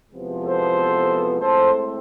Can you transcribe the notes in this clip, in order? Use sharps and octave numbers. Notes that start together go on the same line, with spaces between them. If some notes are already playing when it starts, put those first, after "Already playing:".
E2 C3 F3 G#3 B3
A4 C5
A2 G#3 C4 A4 C5